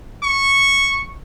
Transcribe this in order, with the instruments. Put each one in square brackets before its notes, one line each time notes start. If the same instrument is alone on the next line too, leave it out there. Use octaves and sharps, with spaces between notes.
[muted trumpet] C#6